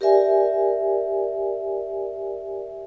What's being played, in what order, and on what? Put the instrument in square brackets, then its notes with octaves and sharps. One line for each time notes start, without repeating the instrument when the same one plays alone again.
[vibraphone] G4 A#4 D5 E5 G#5